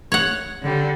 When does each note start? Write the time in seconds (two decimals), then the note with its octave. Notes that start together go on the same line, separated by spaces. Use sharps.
0.12 C#5 F#5
0.61 D3 G3